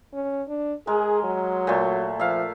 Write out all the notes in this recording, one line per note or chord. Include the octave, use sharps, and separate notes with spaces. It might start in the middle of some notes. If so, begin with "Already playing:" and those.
C#4
D4
G#3 G#4 A#4
F#3
A#2 A3
F3 E5 F5